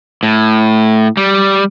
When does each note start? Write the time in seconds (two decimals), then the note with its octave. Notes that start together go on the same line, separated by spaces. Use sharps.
0.23 A2
1.17 G3